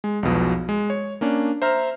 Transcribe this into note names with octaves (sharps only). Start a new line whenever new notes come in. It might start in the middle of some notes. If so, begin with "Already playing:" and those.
G#3
B1 E2 B2 F3
G#3
C#5
A#3 C#4 D4
C5 E5 A#5 F6